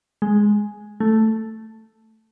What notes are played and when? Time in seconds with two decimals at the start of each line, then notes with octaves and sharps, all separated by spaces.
0.22 G#3
1.00 A3